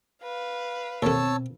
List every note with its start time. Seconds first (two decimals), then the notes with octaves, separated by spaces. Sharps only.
0.23 B4 F5
1.02 D#2 B2 C4 A4 C#5 A5 E6